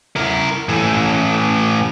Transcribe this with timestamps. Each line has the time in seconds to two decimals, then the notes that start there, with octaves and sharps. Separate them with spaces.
0.16 E4 A#4
0.69 A2 E3